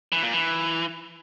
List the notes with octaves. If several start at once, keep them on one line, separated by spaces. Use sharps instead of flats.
E3
A#2
E3